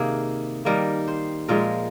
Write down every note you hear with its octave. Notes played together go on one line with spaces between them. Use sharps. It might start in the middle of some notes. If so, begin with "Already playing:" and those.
Already playing: C3 D#3 A#3 G#4
D#3 G3 A#3 A#4
C5
A#2 F3 G#3 A#4